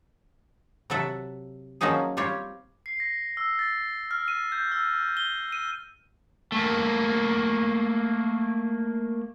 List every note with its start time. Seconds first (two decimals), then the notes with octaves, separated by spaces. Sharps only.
0.90 C3 F#3 A4 E5 F#5
1.81 F3 F#3 A#3 C#4 D#4 G#4
2.17 G3 C4 F4 G4 C#5
2.86 C7
3.00 A#6
3.37 E6
3.59 A6
4.11 F6
4.28 D#7
4.52 G6
4.72 E6
5.17 G7
5.52 D#7
6.52 A3 A#3